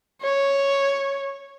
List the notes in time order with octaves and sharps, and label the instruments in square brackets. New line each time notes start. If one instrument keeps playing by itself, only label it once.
[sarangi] C#5